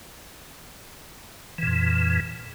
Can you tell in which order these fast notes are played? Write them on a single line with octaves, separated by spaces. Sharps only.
E3 A#2 F2